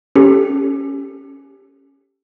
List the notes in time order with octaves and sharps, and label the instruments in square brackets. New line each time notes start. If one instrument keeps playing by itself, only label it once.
[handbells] C#4 G4 A4